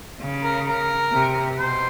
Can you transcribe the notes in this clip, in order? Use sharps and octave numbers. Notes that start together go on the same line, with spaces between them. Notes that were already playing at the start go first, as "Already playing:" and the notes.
C#3
A#4
A#4
C3
B2 C5